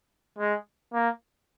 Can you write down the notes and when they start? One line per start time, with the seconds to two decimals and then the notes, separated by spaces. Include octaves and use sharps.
0.39 G#3
0.93 A#3